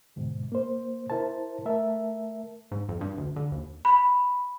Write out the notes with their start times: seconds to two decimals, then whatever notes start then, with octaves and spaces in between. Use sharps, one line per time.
0.16 D2 G#2 B2
0.52 A#3 C5
1.10 E4 A#4 C5 A5
1.65 A3 A#4 E5 A5
2.72 G#2
2.89 F2
3.01 G2
3.18 D2
3.36 D3
3.52 D#2
3.85 B5